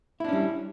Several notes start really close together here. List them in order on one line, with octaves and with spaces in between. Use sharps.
E4 D4 C#4 G3